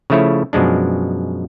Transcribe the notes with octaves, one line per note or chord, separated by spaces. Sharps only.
C#3 F3 A3 E4 C#5
F#2 B2 F3 G#3 D4